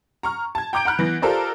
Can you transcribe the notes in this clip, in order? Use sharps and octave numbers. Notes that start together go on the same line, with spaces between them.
A#5 C#6 F6
A5 G#6
G5 A#5 D6 G6 D7
F#5 A#5 B5 F6 F#6
E3 B3 A#6
F4 G4 A4 A#4 C5 D5